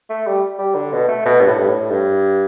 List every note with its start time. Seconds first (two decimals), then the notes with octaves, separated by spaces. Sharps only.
0.10 A3
0.27 G3
0.59 G3
0.75 D3
0.93 B2
1.08 A3
1.25 B2
1.41 G2
1.47 A2
1.59 G2
1.68 A2
1.90 G2